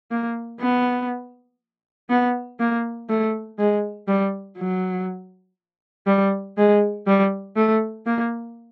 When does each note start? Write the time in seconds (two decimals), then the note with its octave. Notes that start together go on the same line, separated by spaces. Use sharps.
0.11 A#3
0.61 B3
2.10 B3
2.60 A#3
3.09 A3
3.59 G#3
4.08 G3
4.58 F#3
6.07 G3
6.57 G#3
7.07 G3
7.56 A3
8.06 A#3